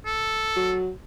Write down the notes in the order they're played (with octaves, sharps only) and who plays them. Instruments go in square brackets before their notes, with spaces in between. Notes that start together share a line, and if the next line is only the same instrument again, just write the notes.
[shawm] A4
[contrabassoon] F#3